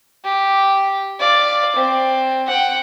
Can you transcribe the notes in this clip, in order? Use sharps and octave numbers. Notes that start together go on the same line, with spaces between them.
G4
D5 F5
C4
F#5 G5